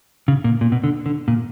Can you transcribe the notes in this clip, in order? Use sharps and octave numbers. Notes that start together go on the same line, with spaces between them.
C#3
A#2
A#2
B2
D3
D3
A#2